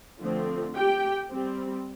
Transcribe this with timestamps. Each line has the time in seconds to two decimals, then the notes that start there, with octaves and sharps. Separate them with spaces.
0.20 D3 F3 A3 C4
0.76 G4 G5
1.31 G3 C4